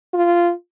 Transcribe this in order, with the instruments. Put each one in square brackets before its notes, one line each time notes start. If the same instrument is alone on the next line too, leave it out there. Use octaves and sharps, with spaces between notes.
[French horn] F4